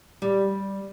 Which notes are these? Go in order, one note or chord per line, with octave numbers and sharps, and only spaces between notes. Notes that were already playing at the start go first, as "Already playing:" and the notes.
G3